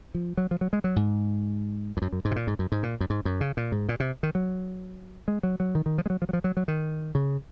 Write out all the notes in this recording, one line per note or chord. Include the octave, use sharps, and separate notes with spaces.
F3
F#3
F3
F#3
G#3
F#3
G#2
F2
F#2
F#2
G#2
C3
A#2
G#2
F#2
G#2
A#2
F#2
G#2
F#2
C#3
A#2
G#2
A#2
C3
D#3
F#3
G#3
F#3
F#3
D#3
D#3
F3
G#3
F#3
F3
F#3
F3
F#3
F#3
D#3
C#3